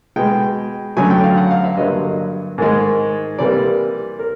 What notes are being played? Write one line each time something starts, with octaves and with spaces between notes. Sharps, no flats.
B2 G#3 G5
F#2 D3 F#3 A3 G#5
G5
F5
F#5
F5
E5
G2 D3 F#3 A#3 D#5
G#2 D#3 G#3
C3 E3 G3 A#3 D5
A#4